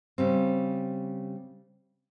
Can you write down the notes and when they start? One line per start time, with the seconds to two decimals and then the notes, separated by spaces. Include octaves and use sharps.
0.18 C#3 G3 C4